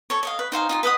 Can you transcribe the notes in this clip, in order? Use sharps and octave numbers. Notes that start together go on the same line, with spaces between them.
A4 C#5
C#5 D#5 F5
B4
D#4 C5 F5 G#5
D#4 F4 G#5
B4 D#5 F#5 D#6